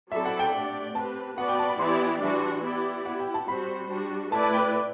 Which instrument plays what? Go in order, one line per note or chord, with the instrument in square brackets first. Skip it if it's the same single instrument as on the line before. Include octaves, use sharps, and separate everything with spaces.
[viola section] F#3 C4 E4 A4 D5 [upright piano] E5
[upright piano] F#5
G5
[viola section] A3 D4 G4 D5
[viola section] C4 G4 B4 [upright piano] A5
[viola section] B3 F#4 B4 D5 [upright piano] F#5
[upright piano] G5
A5
B5
[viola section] E3 B3 E4 G4 D5 [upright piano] C6
[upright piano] D6
[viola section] E3 G3 D4 F#4 [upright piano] E5
[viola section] B3 E4 G4 D5
[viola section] B3 E4 G4 [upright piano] F#5
[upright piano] G5
A5
[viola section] G3 C4 F#4 C5 [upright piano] B5
[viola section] G3 D4 F#4
[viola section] A3 E4 B4 D5 [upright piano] A5
[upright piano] A5
G5